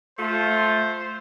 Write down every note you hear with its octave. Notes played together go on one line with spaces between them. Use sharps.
A3 F4 C5